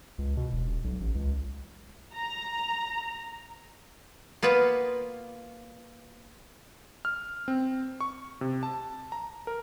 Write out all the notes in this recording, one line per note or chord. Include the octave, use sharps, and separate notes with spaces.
C#2
B2
E1
D#1
B1
A1
C#2
A#5
A#3 B3 F4 B4
F6
C4
C#6
C3
A5
A#5
A#4